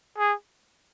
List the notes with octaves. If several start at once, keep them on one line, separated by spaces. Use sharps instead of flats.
G#4